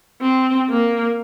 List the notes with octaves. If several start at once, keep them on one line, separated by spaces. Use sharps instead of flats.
C4
A#3